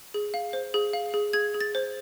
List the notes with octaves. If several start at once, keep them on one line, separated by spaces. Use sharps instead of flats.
G#4
F5
C5
G#4
F5
G#4
G#4 G#6
G#4
A6
C5